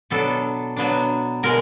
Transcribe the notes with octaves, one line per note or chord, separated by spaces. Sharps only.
B2 F#3 B3 D4 A4
B2 F#3 B3 D4
B2 G#3 A#4